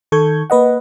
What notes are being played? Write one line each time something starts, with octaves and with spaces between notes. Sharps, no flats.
D#3 A4 C#6 G6 G#6
A#3 B4 D#5 F#5